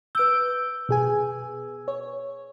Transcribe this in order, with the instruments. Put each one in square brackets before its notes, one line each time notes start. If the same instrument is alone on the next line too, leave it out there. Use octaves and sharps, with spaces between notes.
[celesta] B4 E6 [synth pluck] G6 D7
[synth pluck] B2 G#4 G#5
C#5